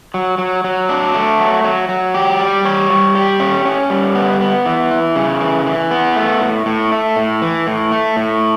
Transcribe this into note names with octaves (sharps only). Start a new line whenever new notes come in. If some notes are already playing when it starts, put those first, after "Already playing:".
F#3
F#3
F#3
D4
A3
F#3
F#3
F#3
G4
G3
C#5
G3
G4
C#4
C#4
G3
B3
B3
E3
E4
C#3
E3
E3
B3
A3
A2
A2
A3
A2
E3
A2
A3
A2